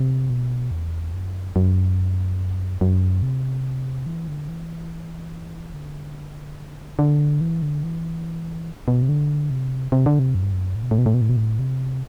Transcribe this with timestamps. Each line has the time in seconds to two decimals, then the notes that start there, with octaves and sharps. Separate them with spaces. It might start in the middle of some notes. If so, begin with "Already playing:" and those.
Already playing: C3
0.30 B2
0.71 E2
1.14 F#2
1.56 F#2
2.81 F#2
3.23 C3
4.06 E3
4.28 D3
4.49 E3
5.74 D3
6.99 D3
7.41 E3
7.62 D3
7.84 E3
8.88 B2
9.02 C3
9.09 D3
9.51 C3
9.92 C3
10.06 D3
10.19 C3
10.35 F#2
10.43 G2
10.53 F#2
10.76 A2
10.83 B2
10.91 A2
10.98 B2
11.06 A2
11.14 B2
11.21 A2
11.29 B2
11.37 A2
11.59 C3